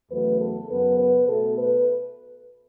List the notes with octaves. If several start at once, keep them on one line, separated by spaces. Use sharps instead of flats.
E2 C#3 F#3 A3 B4
A4
F#2 C#3 F#3 B3 B4
B4
B2 A3 A4
B4